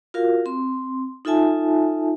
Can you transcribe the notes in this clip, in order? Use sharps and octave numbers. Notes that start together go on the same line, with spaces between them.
F4 F#4 A#4 F5
C4 C6
D#4 F4 A4 E5 G#5 A5